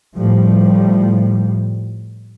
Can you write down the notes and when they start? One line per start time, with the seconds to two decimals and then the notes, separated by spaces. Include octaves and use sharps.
0.17 A2 F3 G3